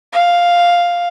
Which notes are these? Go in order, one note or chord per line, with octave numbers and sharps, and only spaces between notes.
F5